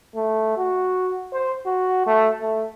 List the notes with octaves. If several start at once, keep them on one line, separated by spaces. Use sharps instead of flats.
A3
F#4
C5
F#4
A3
A3